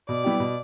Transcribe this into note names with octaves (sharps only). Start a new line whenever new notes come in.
B2 D5
G3 B3 E4 G4
B2